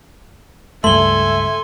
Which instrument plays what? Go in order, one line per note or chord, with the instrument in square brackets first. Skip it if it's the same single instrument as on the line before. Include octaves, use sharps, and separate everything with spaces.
[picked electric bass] C#2 G2 A3 [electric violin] A4 G#5 [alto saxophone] E5 [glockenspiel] C6 G7